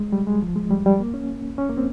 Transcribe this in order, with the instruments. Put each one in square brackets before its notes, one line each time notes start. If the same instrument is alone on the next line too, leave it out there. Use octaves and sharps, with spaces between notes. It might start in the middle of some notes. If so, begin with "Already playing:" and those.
Already playing: [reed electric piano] G#3
G3
G#3
F3
G#3
G3
G3
A#3
C#4
C#4
A#3
C4